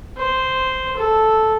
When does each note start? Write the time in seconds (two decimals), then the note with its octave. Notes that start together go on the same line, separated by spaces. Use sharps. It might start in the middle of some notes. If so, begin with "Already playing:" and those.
0.17 C5
0.96 A4